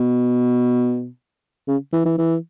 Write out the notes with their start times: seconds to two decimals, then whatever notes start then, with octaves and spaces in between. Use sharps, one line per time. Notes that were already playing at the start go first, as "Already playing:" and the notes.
Already playing: B2
1.68 C#3
1.93 E3
2.05 E3
2.18 E3